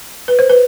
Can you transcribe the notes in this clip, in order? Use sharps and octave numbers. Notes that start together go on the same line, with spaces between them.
B4
C5
B4